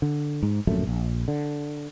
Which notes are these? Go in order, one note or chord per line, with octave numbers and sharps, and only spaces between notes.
D3
G#2
D1 A#1 F#2 A3
A#1
D3